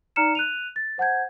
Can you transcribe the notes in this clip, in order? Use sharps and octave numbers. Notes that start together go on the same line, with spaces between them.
D#4 D5 A#5 F6 C#7 E7
F#6 D#7 F7
A6
C5 F#5 A5 G6 G#6